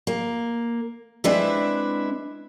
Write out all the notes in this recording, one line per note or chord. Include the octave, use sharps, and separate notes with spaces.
A#3
G#3 C4 D4 E4 B4 E5